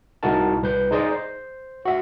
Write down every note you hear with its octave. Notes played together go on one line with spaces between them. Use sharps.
C2 D#4 E4 F#4 A#4 A5
C2 B4 G6
D#4 G#4 C5 D5 D#5
C5
F#4 E5